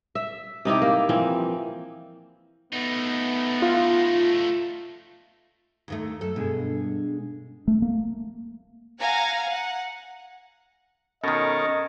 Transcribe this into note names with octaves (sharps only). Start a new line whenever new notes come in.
E5
C3 D#4 E4 G4
A#3
E3 F3 C4
A3 B3 D#4
F4
D#2 D#3 A3
F#2 A4
G2 B2 G#3 G#4
A3
A#3
F5 F#5 G#5 A#5
F#5
B2 D#3 C#4 A4 A#4 D#5